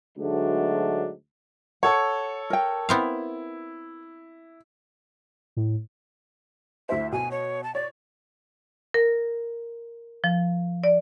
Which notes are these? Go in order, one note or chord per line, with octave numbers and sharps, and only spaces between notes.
D2 G#2 F#3 G#3 A3 D4
A4 C#5 F#5
A#4 G5
B3 C4 E4 F5
A2
D2 E4 C5 E5
B2 G#5
C#5
A5
C#5 D5
A#4
F3
D5